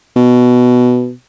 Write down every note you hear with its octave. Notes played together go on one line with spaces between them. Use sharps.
B2